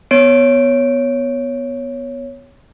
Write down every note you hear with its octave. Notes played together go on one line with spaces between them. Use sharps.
B3 C#5 D7